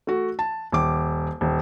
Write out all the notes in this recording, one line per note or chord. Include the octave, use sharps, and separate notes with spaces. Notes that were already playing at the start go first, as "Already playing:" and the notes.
A3 F#4
A5
D#1 D6
D#1